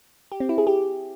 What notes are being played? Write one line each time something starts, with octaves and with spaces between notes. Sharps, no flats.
G4
C4
E4
G#4
G4